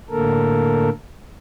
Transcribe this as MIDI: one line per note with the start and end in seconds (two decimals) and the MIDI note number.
0.10 0.89 45
0.10 0.89 50
0.10 0.89 58
0.10 0.89 69
0.10 0.89 70